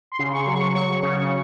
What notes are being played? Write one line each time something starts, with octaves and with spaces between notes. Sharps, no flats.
C6
C#3
C#6
F#3
C#6
F#3 C#6
C#3